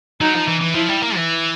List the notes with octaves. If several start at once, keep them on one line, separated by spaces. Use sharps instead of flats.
F#3 D#4
F3
E3
E3
F3 E4
G3
A#3
E3